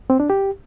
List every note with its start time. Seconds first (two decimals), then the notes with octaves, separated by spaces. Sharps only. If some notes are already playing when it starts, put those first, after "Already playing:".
0.10 C4
0.20 D4
0.30 G4